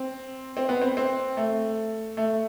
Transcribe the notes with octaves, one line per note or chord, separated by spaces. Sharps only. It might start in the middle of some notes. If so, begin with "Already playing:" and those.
Already playing: C4
C4
B3
C4
C4
A3
A3